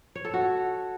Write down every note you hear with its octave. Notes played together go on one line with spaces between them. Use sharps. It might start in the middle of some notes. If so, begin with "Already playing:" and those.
C#5
A4
F#4